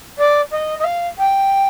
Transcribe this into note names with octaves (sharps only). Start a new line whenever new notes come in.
D5
D#5
D#5
F5
G5